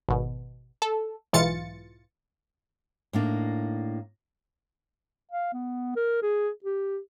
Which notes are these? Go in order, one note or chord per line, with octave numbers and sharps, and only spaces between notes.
G#1 B2
A4
B1 G#2 E3 F4 A6 C#7
A2 A#3 D4 D#4
F5
B3
A#4
G#4
G4